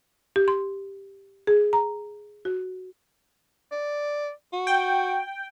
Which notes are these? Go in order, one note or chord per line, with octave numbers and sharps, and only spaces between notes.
G4
C6
G#4
A#5
F#4
D5
F#4
G5